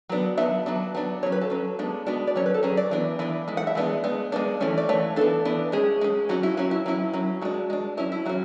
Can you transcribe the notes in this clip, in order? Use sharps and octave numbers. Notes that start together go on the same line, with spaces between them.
F#3 B3 D4
F#3 B3 D4 E5
F#3 B3 D4
F#3 B3 D4
F#3 C#4 C#5
B4
A4
F#3 C#4
G#3 B3 D4
G#3 B3 D4 F#4
D5
F#3 C#4 C#5
B4
A4
F#3 C#4 G#4
D5
E3 B3 D4
E3 B3 D4
E3 G#3
F#5
E5
E3 G#3 B3 D4
G#3 B3 D4
G#3 B3 D4 D5
E3 A3 C#4
D5
E3 A3 C#5
E3 B3 D4 A4
E3 B3 D4
G#3 C#4 G#4
G#3 C#4
F#3 C#4 F#4
E4
F#3 C#4 F#4
E4
F#3 C#4 E4
F#3 C#4
G#3 D4 F#4
G#3 D4
F#3 C#4 E4
E4
F#3 C#4 F#4